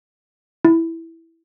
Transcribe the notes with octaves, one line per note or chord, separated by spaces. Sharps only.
E4